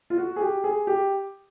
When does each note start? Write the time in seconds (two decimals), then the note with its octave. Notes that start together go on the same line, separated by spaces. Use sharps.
0.10 F4
0.18 F#4
0.36 G#4
0.41 G4
0.64 G#4
0.87 G4